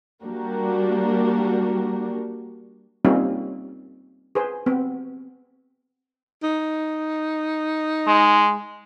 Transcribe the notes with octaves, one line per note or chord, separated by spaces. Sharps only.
G3 A#3 D4 F#4 G4 A#4
G3 A#3 C4 C#4 D#4 F4
G#4 B4 C5
B3 C4
D#4
G#3